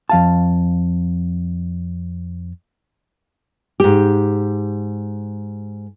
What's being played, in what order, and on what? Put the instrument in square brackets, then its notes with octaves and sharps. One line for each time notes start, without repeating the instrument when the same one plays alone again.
[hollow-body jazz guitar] F2 F5 A5
[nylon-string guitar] G#2 G4